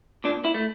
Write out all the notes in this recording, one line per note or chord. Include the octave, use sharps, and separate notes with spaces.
A#2 D4
E4
A3